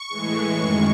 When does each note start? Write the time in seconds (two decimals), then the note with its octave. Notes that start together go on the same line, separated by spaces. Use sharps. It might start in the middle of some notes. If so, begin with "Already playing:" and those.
Already playing: C#6
0.10 A2 E3 G#3
0.58 F#2 D#3 G#3